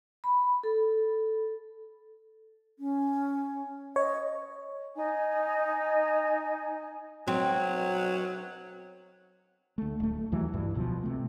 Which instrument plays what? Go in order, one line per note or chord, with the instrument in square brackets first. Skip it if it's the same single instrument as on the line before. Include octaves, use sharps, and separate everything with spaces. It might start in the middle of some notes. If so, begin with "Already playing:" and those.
[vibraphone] B5
A4
[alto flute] C#4
[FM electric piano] C#5 [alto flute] D#5
[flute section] D#4 G#5
[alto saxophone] F#3 [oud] C4
[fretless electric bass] D2 A3
D1 A3
D#2 E3 F#3
A#1 G2 E3
D1 B1 B2 F3
C3 A3